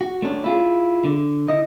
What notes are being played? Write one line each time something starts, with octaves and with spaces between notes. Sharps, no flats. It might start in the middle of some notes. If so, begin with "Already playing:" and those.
F#4
A3 C#4 D4
E4 F4 G#4
D3
E4 D#5